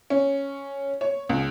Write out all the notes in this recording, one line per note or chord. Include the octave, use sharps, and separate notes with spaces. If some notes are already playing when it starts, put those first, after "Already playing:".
C#4
C#5
C#2